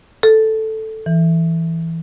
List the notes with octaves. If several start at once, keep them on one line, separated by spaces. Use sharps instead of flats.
A4
E3